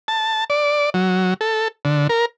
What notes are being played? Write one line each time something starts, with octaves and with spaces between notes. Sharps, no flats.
A5
D5
F#3
A4
D3
A#4